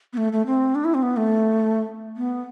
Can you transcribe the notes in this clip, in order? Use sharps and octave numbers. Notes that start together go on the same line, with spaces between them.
B3
A3
A3
C4
D4
E4
C4
B3
A3
B3